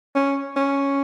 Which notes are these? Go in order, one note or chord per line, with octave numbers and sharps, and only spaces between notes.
C#4
C#4